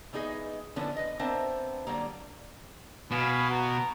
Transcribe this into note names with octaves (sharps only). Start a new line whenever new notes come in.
E3 B3 D#4 G#4 D#5
D3 E3 F3 B3 C#4 D4
B4 D#5
B3 C4 D4 A#4 C5 E5
D3 F#3 G3 A#3
B2 F5 G#5 B5
B3 F#4 A#5